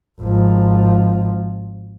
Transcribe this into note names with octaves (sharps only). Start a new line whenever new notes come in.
G#1 F3